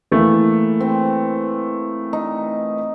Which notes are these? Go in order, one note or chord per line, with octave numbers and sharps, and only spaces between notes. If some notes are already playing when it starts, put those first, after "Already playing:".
E3 A3 A#3
C4
D#4